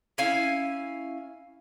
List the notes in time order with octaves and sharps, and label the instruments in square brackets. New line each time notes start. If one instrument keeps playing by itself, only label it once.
[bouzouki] C#4 E4 F5 G#5